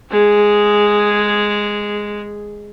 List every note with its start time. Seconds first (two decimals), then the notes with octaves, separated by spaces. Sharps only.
0.11 G#3 G#4